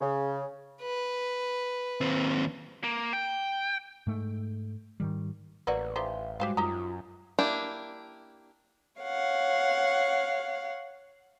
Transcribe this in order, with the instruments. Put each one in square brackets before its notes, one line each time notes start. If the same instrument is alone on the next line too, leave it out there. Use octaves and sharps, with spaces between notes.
[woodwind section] C#3
[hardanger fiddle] B4
[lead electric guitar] D#2 C4
A#3
G5
[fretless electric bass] G#2 A3
G#2 D#3 G3
[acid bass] A1 [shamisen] F#3 A#3 F#4 [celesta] B4 D5
[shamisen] D#3 G4 C5 [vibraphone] E5 F5
[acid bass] G#2 [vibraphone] G3 G#3 F#4 [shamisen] G4 C5 F5
[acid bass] F#2 [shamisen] D#4 G4 A#5 [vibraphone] F4 [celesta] D#6
[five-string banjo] A#3 D4 E4 G4
[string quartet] C#5 F5 F#5